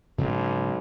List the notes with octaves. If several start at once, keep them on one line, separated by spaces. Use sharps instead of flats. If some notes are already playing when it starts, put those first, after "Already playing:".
B1 G#2 C#3 C4